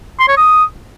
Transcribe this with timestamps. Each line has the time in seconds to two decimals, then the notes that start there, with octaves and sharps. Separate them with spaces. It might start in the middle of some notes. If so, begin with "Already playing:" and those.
0.19 C6
0.28 C#5
0.37 D#6